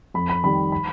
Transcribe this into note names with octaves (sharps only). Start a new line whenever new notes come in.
F2 B5
B5
D#3 G3 B5
B5